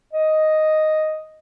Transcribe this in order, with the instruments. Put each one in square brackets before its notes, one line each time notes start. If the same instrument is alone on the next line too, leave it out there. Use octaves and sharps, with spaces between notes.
[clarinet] D#5